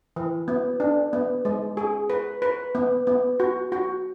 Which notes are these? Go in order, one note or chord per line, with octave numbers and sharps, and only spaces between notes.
E3
B3
D4
B3
G#3
G#4
B4
B4
B3
B3
F#4
F#4